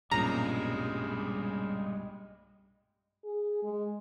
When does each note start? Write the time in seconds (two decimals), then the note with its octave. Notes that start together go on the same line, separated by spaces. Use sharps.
0.11 B1 G2 A#2 C#3 G3 G#3 A#5
3.25 G#4
3.63 G#3